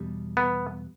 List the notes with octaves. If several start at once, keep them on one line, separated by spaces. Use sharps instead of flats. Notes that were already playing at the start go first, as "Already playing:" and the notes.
Already playing: E2 B2 G3
B3